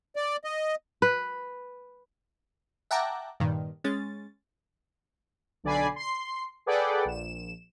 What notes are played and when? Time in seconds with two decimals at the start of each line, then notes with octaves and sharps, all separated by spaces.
0.16 D5
0.44 D#5
1.02 B4
2.91 E5 F#5 G5 A5 A#5 D6
3.40 G2 A#2 D#3
3.84 G#3 C#4 A6
5.64 B1 D3 D5 G#5 B5 C7
5.96 C6 C7
6.66 G#4 A4 B4 D5 F#5 G5
7.05 A#1 E7